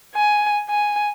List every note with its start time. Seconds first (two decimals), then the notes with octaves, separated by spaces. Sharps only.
0.15 G#5
0.69 G#5